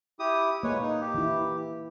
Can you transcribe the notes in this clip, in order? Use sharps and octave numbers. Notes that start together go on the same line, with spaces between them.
E4 G4 D#6
G#3 A#3 B4 C#5
D#4
G4
E3 E4